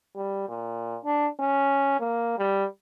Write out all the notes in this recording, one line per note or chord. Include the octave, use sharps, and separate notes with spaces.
G3
A#2
D4
C#4
A#3
G3